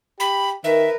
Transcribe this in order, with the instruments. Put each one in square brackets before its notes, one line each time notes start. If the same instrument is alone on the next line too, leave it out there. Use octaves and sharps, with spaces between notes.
[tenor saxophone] G4 [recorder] B5
[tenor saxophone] D#3 [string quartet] A#4 B4 [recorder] E5